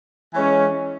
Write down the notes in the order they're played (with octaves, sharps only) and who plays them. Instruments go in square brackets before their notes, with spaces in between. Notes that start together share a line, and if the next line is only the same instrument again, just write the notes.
[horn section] E3 G#3 C#4